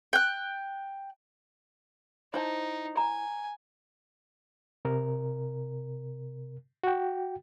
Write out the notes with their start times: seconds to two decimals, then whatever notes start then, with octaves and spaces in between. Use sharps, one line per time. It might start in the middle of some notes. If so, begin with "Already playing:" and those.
0.13 G5 F#6
2.34 D#4 E4 C5 A5
2.97 G#5 A#5
4.85 C3 A#4
6.84 F#4 G5